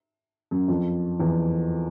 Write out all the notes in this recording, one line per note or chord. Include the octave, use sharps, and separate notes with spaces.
F#2
F2
E2